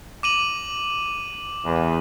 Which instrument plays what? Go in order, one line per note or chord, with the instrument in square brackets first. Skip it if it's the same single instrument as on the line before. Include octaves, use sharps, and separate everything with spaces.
[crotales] D6 D#7 F#7
[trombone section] E2